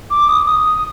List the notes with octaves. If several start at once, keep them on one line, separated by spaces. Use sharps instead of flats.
D6
D#6
D#6